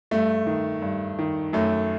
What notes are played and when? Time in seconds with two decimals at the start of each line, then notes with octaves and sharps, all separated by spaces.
0.11 G2 A3
0.46 D#3
0.82 G2
1.19 D#3
1.53 F#2 A3